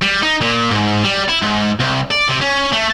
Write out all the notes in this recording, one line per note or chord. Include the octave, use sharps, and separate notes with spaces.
G3
D#4
A#2
G#2
G3
E4
G#2
C2
D5
C3
C#4
A3